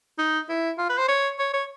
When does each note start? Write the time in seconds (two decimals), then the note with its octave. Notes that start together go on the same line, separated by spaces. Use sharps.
0.18 D#4
0.49 E4
0.78 F4
0.89 B4
0.98 C5
1.08 C#5
1.39 C#5
1.54 C#5